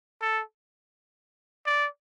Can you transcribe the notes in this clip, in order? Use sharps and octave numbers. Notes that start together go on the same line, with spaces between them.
A4
D5